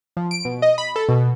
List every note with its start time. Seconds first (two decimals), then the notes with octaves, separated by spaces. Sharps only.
0.17 F3
0.31 D7
0.45 B2
0.62 D#5
0.78 B5
0.96 A4
1.09 B2